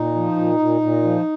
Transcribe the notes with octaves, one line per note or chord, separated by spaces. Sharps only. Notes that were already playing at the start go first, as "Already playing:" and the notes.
Already playing: A#2 D#4
F3
A#2
A#2
A#2
F3